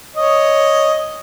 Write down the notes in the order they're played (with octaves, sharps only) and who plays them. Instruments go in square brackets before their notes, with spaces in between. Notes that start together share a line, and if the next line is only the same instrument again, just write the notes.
[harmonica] C#5 D#5